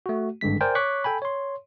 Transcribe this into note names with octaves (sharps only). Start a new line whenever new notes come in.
A3 F#4
G#1 G2 D3 G#3 B6
A#4 C5 D5 G5 G#5
C#5 C#6 D6 F#6 B6
A4 G5 G#5 B5
C#5 C6